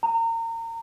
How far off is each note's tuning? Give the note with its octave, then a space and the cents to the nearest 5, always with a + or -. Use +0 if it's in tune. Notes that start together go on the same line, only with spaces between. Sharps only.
A#5 -30